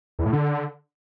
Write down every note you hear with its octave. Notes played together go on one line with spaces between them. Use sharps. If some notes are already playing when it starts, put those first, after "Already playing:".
E2
A2
D3